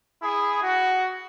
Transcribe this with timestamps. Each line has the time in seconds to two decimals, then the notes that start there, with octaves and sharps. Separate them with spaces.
0.22 E4 G#4
0.62 F#4